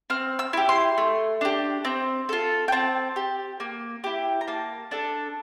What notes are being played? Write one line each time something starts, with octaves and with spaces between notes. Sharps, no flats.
C4 F6
E6
E4 G4
C6
A3
D4 G4
C4
F4 A4
G5
C4 A5
G4
A#3
E4 G4
A#5
A#3 A5
D4 A4